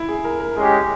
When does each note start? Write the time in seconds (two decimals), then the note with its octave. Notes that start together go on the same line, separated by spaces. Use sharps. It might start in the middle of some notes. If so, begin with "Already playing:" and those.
Already playing: E4
0.08 G#4
0.24 A#4
0.40 A#4
0.56 G#3 C#4 G4 G#4